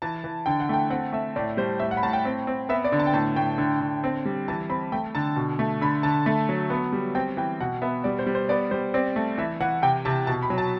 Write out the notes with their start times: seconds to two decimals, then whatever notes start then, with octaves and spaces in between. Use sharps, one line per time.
0.02 E3 A5
0.24 E3
0.46 D3 G5
0.60 F#5
0.69 A3 G5
0.90 C4 F#5
1.13 A3 E5
1.36 A2 D5
1.57 G3 C5
1.80 A2 E5
1.91 F#5
1.97 B5
2.03 A2 A5
2.13 G5
2.25 C4
2.47 C4
2.69 B3 E5
2.84 D5
2.92 D3
2.99 A5
3.07 G5
3.13 A2 A5
3.36 A2 G5
3.58 D3
3.81 D3
4.04 C4
4.25 G3
4.48 E3 A5
4.70 C4 B5
4.92 A3 G5
5.15 D3 A5
5.36 B2
5.59 A3
5.81 D3 B5
6.03 D3 A5
6.26 A3
6.49 F#3
6.70 B3
6.93 G3
7.15 C4 G5
7.37 E3 G5
7.60 B2 F#5
7.82 B3 E5
8.04 G3 D5
8.19 C5
8.27 G3
8.35 C5
8.49 B3 D5
8.71 G3 C5
8.94 C4 D5
9.16 A3
9.38 E3 E5
9.60 E3 F#5
9.82 C3 G5
10.05 C3 A5
10.27 B2 A5
10.43 B5
10.50 F#3
10.58 A5